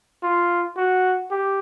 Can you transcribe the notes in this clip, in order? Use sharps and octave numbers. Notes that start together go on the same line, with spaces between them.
F4
F#4
G4